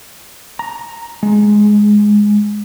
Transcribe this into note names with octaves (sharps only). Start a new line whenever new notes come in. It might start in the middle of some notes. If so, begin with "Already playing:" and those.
A#5
G#3